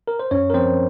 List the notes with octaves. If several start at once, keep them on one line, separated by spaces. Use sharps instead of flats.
A#4
C5
F#2 C#4 C#5
A#4
F3 C4 C5